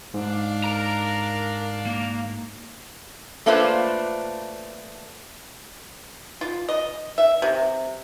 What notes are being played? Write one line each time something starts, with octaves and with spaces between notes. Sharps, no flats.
G#2 D4 F5
A#4 A#5
A#3
A3 A#3 D4 F4 B4 C5
F4
D#5
E5
C3